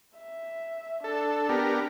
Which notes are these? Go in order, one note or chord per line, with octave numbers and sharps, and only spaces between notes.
E5
D4 A4
B3 G4 A#4